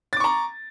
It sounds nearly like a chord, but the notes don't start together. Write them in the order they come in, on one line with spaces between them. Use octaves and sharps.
A6 D6 C#6 A#5